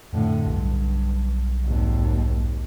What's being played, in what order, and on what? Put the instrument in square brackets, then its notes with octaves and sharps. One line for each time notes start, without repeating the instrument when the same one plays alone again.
[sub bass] F2 [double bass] A2 D3
[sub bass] B1 [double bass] G2
[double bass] G#1 D#2